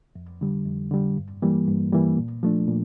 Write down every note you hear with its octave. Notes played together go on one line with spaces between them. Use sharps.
F2
D3 G3
F2
D3 G3
G2
E3 G3 A#3
G2
E3 G3 A#3
A#2
F3 A3 D4
A#2